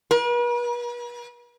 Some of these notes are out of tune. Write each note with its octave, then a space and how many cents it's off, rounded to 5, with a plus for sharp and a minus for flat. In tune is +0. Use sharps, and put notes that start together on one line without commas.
B4 -45